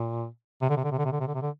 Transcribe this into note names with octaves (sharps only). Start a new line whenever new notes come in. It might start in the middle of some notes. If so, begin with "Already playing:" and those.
Already playing: A#2
C3
D3
C3
D3
C3
D3
C3
D3
C3
D3
C3
D3